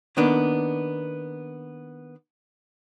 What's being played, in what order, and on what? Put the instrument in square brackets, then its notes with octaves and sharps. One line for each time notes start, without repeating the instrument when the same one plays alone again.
[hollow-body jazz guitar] D#3 A#3 B3 D4